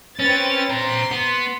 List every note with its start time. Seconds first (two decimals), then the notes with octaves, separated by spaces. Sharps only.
0.19 C4 C#4 B4 A6
0.70 C5 A#5 C6 B6
1.11 B3